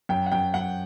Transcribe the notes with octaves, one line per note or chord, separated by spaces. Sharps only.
F#2 G5
F#5
F#2 G5
F#2 F#5